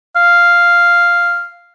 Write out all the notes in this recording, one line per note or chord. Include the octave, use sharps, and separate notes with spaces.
F5